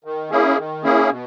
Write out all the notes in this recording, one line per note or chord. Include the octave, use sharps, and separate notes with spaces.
D#3
A#3 C#4 E4 G#4
D#3
A#3 C#4 E4 G#4
B2